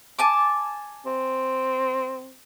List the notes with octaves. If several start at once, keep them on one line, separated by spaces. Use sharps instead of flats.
G#5 A5 D6
C4